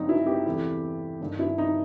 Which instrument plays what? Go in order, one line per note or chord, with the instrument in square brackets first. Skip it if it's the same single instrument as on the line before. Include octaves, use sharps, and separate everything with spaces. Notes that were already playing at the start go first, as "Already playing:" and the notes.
Already playing: [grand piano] G1 G2 F#3 C4 F#4 [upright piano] D#4
[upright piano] E4
G4
[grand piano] E2 C3 E3 A3 E4
G1 G2 D#3
[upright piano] E4
D#4